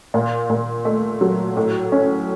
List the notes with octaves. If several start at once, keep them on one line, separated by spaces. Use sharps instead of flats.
A#2
A#2
A3
F#3
A2
C#4